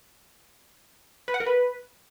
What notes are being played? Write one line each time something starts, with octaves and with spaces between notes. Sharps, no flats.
B4
F#5
A#4
B4